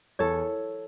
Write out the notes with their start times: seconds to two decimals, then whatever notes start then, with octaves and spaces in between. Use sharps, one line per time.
0.19 E2 A4 C#5